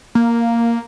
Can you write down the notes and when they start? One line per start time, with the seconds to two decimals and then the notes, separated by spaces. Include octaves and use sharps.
0.15 A#3